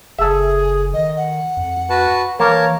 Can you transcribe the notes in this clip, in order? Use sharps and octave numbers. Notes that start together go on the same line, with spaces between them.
F#1 G#4 A4 E5
D#3 D#5
F#5
F2
F#4 B4 A5
E3 A#3 A#4 C#5 A5